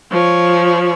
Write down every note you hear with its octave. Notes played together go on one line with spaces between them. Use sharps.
F3 C#5